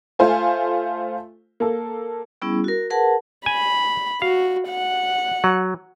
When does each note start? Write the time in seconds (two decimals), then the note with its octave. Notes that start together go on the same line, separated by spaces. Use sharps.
0.19 A3 F4 C5 G#5
1.60 A#3 A4
2.42 G3 B3 C#4 E4 G#4
2.64 F#4 A#4
2.90 G#4 A#4 B4 F#5 A5
3.46 G#5 B5
4.22 F#4 F5
4.68 F#5
5.44 F#3